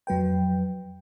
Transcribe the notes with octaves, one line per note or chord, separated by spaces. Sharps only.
F2 F#3 B4 G5